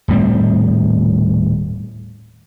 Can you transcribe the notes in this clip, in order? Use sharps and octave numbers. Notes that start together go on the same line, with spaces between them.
D#1 A2 G3 C4